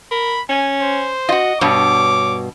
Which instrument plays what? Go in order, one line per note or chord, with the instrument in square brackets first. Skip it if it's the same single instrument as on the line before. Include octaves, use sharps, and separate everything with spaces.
[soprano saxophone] A#4 [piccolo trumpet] B5
[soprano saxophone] C#4 [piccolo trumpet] G#5
[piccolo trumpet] C5
[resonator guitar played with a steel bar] F4 F#4 [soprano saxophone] D#5
[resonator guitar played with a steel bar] G2 B2 [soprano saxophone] C#5 [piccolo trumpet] D6